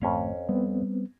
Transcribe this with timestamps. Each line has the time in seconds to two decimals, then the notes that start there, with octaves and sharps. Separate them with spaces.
0.02 G#1 F2 A3 C4 C#4 F5
0.49 G3 B3 C4